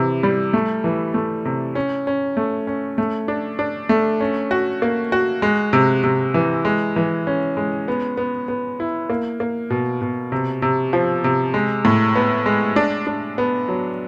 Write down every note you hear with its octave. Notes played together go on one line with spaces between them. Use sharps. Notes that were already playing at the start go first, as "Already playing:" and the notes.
Already playing: C3 E3
G3
A3
E3
A3
C3
C#4
C#4
A3
C#4
A3
D4
D4
A3
C#4
F#4
A#3
F#4
G#3
C3
C3
E3
G#3
E3
C#4
G#3
B3
B3
B3
E4
A#3
A#3
B2
B2
C3
C3
F3
C3
G#3
A2
B3
G#3
D4
D4
B3
F#3